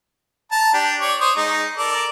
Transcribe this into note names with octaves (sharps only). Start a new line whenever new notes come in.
A5 A#5
D4 G4
C#5 D5
C5 C#5 D#6
G#3 D#4
A4 A#4 D5